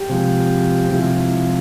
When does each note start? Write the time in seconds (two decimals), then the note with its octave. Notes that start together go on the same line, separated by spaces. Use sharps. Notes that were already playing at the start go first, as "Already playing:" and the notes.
Already playing: G4
0.09 C3 F3 G#3
0.91 C3 F3 G#3 E4
1.18 E4